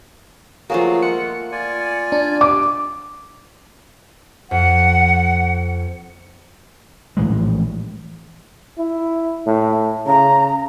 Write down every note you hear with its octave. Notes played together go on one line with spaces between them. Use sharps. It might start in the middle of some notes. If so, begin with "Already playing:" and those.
F3 F#3 A3 A#3 F#4 G#4
G#3 F4 F#5 C#7
F4 D5 G#5
D4
D6
F2 F#5
A#1 A2 E3 G#3
E4
A2
C#3 A#5